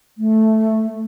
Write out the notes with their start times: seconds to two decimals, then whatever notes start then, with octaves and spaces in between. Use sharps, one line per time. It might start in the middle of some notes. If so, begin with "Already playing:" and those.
0.18 A3